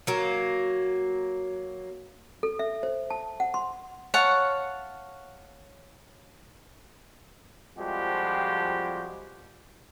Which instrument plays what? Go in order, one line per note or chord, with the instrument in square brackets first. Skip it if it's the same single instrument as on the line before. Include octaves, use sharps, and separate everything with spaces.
[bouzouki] F#3 A#3
[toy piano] A4
E5
C5
A5
F#5
C6
[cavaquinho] C#5 F5 F#5 A5
[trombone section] F2 F3 G3 G#3 F#4 G4